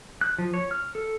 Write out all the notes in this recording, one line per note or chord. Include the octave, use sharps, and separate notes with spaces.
F#6
F3
C#5
F6
A4